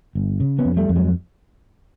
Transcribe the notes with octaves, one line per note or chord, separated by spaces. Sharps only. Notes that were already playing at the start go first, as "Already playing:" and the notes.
G1
C#3
B3 C#4
F2
G3 A3
F2
F#3 G#3